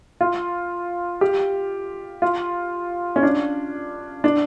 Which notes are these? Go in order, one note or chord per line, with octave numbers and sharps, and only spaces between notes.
F4
G4
F4
C#4
D4
D4